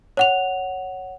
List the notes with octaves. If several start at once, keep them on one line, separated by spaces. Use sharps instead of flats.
C#5 F#5 F7